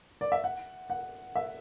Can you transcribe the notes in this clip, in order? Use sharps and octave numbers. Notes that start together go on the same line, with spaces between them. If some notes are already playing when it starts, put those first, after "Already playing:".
D5
E5
F#5
F#5
E5